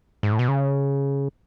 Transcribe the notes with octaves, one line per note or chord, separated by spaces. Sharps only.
G#2
A2
B2
C#3